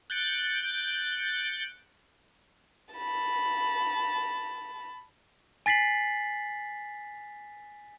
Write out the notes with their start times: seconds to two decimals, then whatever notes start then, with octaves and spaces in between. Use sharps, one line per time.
0.10 F#6 G6 A6 C#7 D7
2.95 A5 B5
5.66 G#5 A6 B6 C7 F#7